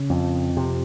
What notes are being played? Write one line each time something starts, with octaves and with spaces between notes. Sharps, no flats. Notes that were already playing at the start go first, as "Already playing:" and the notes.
Already playing: C#3
F2
C3